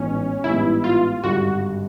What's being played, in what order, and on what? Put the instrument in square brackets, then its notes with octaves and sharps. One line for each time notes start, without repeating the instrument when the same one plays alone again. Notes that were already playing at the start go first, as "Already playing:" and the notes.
Already playing: [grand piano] A1 G#2 E3 G3 B3 [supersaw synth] C#4
[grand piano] A1 G#2 E3 G3 B3 [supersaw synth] E4
[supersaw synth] F4
[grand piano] G#1 G2 D3 G3 [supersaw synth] F#4